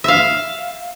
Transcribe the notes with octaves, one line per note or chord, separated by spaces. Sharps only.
E5 F5